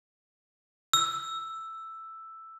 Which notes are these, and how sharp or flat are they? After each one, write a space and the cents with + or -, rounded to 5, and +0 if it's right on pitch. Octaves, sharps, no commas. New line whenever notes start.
E6 +5